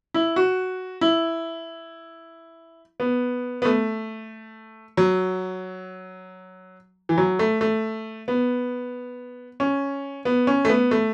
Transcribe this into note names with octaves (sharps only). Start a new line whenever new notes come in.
E4
F#4
E4
B3
B3
A3
F#3
E3
F#3
A3
A3
B3
C#4
B3
C#4
A3
B3
A3